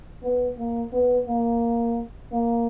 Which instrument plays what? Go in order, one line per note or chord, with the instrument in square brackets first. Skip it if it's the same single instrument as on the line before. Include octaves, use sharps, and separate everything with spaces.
[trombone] B3
A#3
B3
A#3
A#3